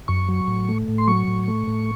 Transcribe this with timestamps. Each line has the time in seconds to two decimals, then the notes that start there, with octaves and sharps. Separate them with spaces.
0.08 F#2 C#6
0.29 F#3
0.48 A2
0.69 A3
0.88 A2
0.98 C6
1.08 F#3 C#6
1.28 A2
1.48 A3
1.67 A2